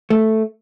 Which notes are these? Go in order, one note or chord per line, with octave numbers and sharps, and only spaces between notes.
A3